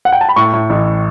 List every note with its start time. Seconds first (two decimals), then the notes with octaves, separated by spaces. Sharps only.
0.05 F#5
0.12 G5
0.21 A5
0.29 B5
0.36 A2 C#6
0.53 A2
0.70 A1